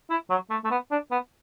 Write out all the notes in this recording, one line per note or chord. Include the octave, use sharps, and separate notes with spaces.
E4
F#3
A3
A3
B3
D4
B3